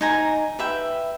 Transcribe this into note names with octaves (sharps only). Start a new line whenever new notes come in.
D#4 G#5 A#5
B4 E5 G5